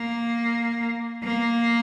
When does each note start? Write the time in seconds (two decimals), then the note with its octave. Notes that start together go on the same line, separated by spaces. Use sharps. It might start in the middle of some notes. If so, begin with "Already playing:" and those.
Already playing: A#3
1.24 A#3